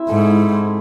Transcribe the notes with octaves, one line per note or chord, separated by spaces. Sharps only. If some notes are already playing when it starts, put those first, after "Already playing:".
Already playing: C4 E4 E5
G#2 A4
E4
C4